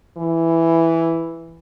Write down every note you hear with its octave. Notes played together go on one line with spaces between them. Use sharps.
E3